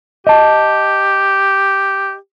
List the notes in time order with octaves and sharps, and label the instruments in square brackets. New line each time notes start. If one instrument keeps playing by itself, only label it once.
[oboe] G4 [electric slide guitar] D#5 A5